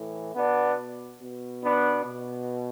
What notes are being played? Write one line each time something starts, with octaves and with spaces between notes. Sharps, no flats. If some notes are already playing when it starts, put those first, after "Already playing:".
Already playing: A2 E3
B2 B3 D4
B2
B3 D4
B2